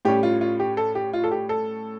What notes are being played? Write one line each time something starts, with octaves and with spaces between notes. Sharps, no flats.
A2 G3 C#4 G4
F4
F4
G4
A4
G4
F4
A4
G4
A4